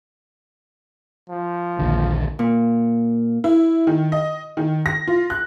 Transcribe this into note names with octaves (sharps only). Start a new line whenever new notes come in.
F3
A#1 D#2 D3
A#2
E4
D#3
D#5
D#3
A#6
F4
F#6